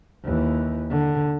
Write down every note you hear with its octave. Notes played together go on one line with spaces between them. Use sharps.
D#2 E3
D3